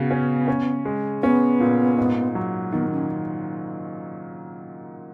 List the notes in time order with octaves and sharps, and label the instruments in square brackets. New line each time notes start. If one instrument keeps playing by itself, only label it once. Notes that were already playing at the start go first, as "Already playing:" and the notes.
Already playing: [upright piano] C#3 F#4 [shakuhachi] B3
[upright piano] C#4
C#4
G#3
[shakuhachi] B3 [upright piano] C#4
[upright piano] A#2
G#2
F#3
[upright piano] D#3 [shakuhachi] B3
[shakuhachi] C#4